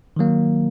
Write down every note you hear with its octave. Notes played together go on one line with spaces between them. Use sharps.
D#3 F#3 A#3